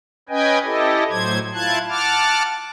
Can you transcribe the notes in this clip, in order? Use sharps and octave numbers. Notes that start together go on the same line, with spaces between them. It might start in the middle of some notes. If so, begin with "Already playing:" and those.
C#4 B4 D#5 G5 G#5
E4 G4 A4 D#5
A2 F#3 C5 G#6
E4 F4 A5 F#6 G#6
F#5 A5 D6 F6